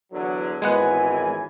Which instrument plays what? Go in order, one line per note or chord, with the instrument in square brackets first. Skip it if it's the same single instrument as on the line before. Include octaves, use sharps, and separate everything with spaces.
[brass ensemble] E2 D3 F#3
[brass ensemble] G#1 F#2 E3 [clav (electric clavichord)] G#3 B3 F#5 [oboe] G#5